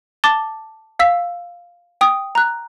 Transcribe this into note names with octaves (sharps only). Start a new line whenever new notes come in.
A5 D6 A6 G7
F5 E6 B6
G5 D#6
A#5 F#6